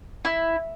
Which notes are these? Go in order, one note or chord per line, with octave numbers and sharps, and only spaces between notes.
E4